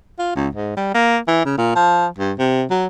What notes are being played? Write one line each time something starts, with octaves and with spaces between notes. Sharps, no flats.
F4
C#2
G#2
G3
A#3
E3
C#3
A#2
F3
G2
C3
F#3